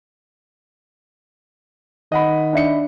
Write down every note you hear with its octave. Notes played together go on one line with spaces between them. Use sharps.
D#3 D#5 F#5 B5
D4 E5 C#7